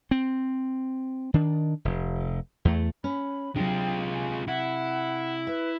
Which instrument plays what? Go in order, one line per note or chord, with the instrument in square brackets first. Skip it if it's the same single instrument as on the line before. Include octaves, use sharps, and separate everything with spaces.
[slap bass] C4
D#3 D4
F1
E2 A3
[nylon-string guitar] C#4 [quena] B5
[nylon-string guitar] C3 [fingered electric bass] F#3 D4 [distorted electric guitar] G#3 F4 [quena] G5
[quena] G#5
[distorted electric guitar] E4 [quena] F#5
[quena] B4 [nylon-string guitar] E5